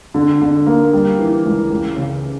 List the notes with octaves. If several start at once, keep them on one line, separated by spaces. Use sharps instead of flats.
D3
D3
A#3
G3
E3
C#2
C#2
C#3